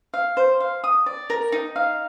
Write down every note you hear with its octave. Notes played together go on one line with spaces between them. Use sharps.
F5
C5
F5
D#6
D5
A#4
D#4
F5